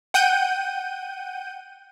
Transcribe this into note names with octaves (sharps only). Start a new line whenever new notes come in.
F#5 G5 G6 D#7